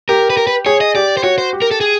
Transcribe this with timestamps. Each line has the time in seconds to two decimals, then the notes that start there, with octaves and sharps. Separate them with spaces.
0.09 G4 A#4
0.30 B4
0.37 A#4
0.47 B4
0.66 G#4 C#5
0.81 D#5
0.95 G4 D5
1.17 C5
1.23 F#4 C#5
1.38 C5
1.53 G4
1.62 A#4
1.71 A4
1.81 G#4